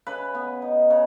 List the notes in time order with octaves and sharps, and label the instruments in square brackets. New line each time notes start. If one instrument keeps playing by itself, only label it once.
[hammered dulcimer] C#3 B4
B3
D#4
C#3